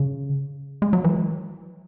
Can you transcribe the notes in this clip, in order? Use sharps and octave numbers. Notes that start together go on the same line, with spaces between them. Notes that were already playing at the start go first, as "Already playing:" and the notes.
Already playing: C#3
G#3
F#3
E3